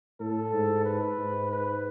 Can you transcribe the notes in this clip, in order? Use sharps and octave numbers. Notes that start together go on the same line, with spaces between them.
A2 A4
G#2
B4
G#2
B4